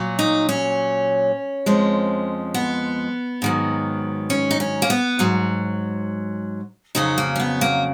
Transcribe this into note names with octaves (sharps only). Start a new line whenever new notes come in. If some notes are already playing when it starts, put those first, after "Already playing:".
Already playing: A#2 F#3
D#4
C#4
F2 F3 G#3
B3
G#2 D#3 F#3
C#4
D#4
C#4
A#3
B3
G#2 F#3
F2 C#3 F#3 D#4
A#3
C#4
B3
A#3